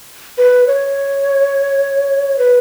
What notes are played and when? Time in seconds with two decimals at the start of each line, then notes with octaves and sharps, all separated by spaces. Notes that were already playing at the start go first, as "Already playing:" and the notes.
0.38 B4
0.67 C#5
2.38 B4